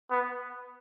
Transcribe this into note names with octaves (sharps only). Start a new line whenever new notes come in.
B3